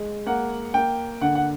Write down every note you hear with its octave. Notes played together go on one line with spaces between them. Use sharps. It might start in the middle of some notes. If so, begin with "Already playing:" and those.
Already playing: G#3
A#3 F#5
A#3 G5
D3 F#5
F#5